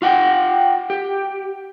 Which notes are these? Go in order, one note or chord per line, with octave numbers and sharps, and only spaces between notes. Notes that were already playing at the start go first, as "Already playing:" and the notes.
F4 F#5 G5
G4